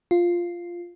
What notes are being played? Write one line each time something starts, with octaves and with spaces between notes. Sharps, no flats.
F4